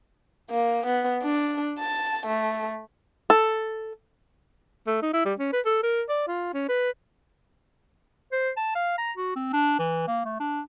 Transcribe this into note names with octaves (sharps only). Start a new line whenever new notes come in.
A#3
B3
D4
A5
A3
A4
A3
D#4
E4
G3
C#4
B4
A4
A#4
D5
F4
C#4
B4
C5
A5
F5
A#5
F#4
C4
D4
E3
A#3
A3
D4